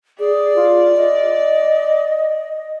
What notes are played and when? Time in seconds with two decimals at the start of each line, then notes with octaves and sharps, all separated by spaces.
0.19 G#4 D5
0.56 F4
0.97 D#5